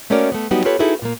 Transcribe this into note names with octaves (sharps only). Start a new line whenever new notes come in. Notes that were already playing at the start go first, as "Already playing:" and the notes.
A3 A#3 C#4 F#4 A#4 D5
A3 B3
F#3 G3 B3 D#4 F#4 G4
F4 G4 A4 B4 C#5
D#4 E4 F#4 G#4 A4 B4
A#2 A#3